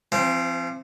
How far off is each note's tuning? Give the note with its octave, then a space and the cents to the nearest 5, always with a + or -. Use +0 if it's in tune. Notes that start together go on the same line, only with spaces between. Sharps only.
F3 -40 C4 +0